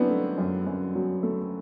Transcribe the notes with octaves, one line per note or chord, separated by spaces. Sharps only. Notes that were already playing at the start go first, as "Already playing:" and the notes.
Already playing: F#2 F#3 B3 C4 D4 E4
A3
F#2
F#2
F#3
A3